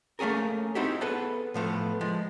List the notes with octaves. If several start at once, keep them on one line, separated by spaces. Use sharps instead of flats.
A3 A#3 C#4 G#4 A#4
C4 D#4 E4 F#4 G4
B3 G#4 A4 B4
A2 F3 A3 B3
F3 G#3